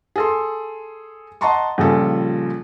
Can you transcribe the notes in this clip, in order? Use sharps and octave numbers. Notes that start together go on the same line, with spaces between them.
G#4 A4 C6
D#5 F#5 A5 A#5 C6 C#6
A#1 C#3 G3 F4 A4